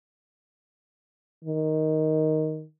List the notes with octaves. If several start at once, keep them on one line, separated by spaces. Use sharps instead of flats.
D#3